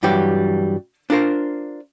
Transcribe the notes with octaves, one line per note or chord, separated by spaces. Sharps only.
G2 E3 F#3 G3 G4
D4 F4 A#4 C5